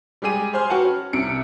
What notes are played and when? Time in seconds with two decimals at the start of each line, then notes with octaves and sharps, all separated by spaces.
0.22 G3 G#3 G4 G#4 D#7
0.53 G#4 C5 G#5 C6 F6
0.69 F#4 B4 F#5 G5 A5
0.84 C#4
1.13 C2 C3 C#7 D7